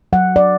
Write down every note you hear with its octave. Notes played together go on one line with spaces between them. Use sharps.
F#3 F#5
D5